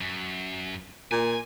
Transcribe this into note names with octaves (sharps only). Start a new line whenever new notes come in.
F#2
A#2 G#5